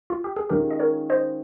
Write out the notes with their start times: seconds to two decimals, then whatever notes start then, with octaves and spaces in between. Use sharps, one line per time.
0.10 F4
0.24 G4
0.36 G#4
0.49 D#3 G#3 C#4 F4 G4 A#4
0.71 D#5
0.79 A#4 C#5
1.10 C5 D#5